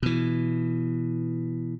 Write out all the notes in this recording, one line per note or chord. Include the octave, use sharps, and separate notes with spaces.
B2 E3